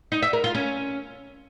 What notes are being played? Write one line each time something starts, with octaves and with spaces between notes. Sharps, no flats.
D#4
E5
A#4
F4
C#4